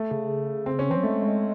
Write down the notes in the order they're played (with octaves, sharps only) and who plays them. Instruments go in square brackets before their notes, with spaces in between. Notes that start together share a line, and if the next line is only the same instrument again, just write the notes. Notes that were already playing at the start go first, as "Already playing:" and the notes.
Already playing: [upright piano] A3
[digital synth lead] C#3
[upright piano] C4
C#4
[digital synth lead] E3 [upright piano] C4
[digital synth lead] F#3
[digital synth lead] G#3 [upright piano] A3
[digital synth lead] G#3